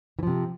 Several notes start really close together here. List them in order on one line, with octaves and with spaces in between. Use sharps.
E3 F3 C3